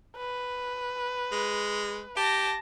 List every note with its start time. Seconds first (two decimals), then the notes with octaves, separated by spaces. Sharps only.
0.17 B4
1.32 G#3
2.17 G4 A5 A#6